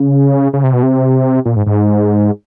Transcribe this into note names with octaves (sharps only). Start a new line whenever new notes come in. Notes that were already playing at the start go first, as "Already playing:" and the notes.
Already playing: C#3
C#3
C3
B2
C3
A#2
G#2
G#2